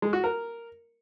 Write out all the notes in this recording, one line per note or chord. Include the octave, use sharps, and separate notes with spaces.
G#3
F#4
A#4